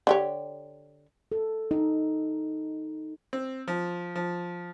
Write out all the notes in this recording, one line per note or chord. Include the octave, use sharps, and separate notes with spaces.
D3 G4 C#5
A4
D#4
C4
F3
F3